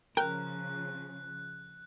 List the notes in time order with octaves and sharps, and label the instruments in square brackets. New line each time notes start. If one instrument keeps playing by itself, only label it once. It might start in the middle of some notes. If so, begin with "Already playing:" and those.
[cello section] C#3 F3 [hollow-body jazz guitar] A#4 [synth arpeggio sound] G5 [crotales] F#6